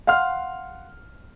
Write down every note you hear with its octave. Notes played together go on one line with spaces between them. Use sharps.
F5 F#5 C6 F6